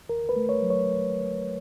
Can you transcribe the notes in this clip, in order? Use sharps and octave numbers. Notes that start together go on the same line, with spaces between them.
D#2 A#4
B4
A3
C#5
F#3
C#5